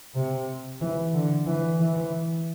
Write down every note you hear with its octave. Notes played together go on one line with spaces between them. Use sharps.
C3
E3
D3
E3
E3